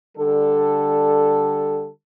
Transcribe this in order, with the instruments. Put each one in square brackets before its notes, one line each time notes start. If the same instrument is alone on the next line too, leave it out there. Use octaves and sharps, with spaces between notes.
[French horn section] D3 G3 A4